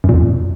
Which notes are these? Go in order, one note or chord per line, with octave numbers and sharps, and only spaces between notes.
F#2
A#2
F2